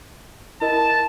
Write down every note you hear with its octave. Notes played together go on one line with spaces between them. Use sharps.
E4 A#4 D#5 A5